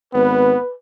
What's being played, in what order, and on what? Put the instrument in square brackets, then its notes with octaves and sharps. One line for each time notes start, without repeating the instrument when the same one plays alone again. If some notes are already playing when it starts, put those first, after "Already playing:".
[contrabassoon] G#1 [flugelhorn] B3 [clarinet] B4